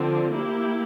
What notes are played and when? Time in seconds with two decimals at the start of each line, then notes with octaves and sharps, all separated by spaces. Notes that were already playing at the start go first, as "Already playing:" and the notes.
Already playing: D3 F3 C4
0.31 A#3 E4 G4